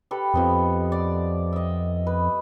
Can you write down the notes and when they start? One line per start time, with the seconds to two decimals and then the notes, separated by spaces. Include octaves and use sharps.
0.11 G4 A4 B4
0.34 F2 F3 B3 D#5
0.92 D5
1.53 D#5 E5
2.07 B4